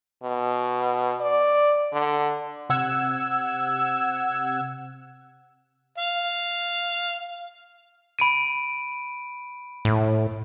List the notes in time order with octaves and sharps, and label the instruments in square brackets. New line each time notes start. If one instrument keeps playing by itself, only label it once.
[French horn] B2
D5
D3
[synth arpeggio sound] C3 F#5 E6 G#6 E7
[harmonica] F5
[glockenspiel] B5 D7 D#7
[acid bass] A2